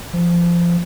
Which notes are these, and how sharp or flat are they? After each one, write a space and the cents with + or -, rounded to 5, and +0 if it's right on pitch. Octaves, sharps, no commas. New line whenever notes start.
F3 -20